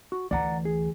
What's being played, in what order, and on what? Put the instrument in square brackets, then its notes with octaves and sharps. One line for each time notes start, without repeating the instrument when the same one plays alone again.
[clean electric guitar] F#4
[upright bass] D2 E3 [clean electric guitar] D5 F#5 A#5
[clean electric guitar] G#4